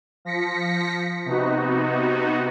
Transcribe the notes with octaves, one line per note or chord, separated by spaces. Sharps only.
F3 A#6 B6 C#7
C3 B3 D#4 F#4